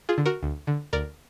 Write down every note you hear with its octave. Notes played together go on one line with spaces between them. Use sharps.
F4 G#4
D3
F#4 A#4
D2
D3
D2 A#4 D5